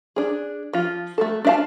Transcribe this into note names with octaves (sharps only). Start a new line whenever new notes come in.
D4 G#4
F3 F4
A3 F#4 A4
D4 F4 E5 F5 A5